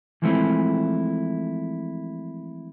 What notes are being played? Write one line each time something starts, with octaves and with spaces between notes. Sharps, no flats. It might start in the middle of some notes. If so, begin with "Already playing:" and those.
E3 F3 G#3 A3 C4 E4